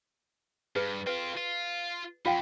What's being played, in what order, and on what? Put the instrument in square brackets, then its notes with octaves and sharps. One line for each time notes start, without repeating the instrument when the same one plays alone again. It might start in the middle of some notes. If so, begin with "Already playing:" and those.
[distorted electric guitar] G2 [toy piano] G#4 B4
[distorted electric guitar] C4 F4 [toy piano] B4
[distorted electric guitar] F4
[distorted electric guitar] F2 [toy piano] F4 F5 G5